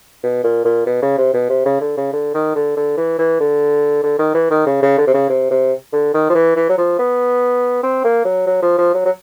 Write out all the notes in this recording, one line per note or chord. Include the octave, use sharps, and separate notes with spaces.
B2
A#2
A#2
B2
C#3
C3
B2
C3
C#3
D3
C#3
D3
D#3
D3
D3
E3
E3
D3
D3
D#3
E3
D#3
C#3
C#3
D3
C3
C#3
C3
C3
D3
D#3
F3
E3
E3
F#3
F3
B3
C4
A#3
F#3
F#3
F3
F3
F#3
F#3